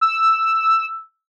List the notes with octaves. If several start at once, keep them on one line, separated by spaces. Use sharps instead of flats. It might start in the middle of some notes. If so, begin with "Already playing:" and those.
E6